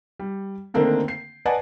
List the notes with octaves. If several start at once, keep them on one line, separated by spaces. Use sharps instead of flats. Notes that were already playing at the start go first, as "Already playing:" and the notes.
G3
D3 D#3 A3 A#3 C4 D4
C7
B4 D5 D#5 F#5 G#5 A5